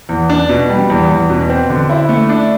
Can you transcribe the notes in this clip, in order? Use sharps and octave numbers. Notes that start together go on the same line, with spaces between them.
E2
D4
B2
G3
E2
E2
B2
C4
D3
E4
A3
D4